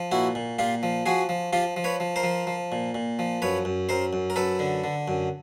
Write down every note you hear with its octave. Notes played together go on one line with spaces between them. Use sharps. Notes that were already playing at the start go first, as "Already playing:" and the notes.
Already playing: F3
A#2 E4 F#4
A#2
A#2 F4 G4
F3
F3 F#4 G#4
F3
F3 F4 G4
F3
B4 C#5
F3
A#4 C5
F3
F3
A#2
A#2
F3
F#2 B4 C#5
F#2
F#2 A#4 C5
F#2
A#4
F#2 A4 B4
D3
D3
F#2